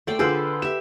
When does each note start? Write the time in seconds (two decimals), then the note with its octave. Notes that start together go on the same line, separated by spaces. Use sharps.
0.07 A3 C5 D5 G5
0.19 D3 F4 G#4 A4 B4 C5
0.62 G4 E5 E7